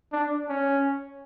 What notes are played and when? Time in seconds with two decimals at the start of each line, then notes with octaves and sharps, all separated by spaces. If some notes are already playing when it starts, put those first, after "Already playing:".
0.13 D4
0.49 C#4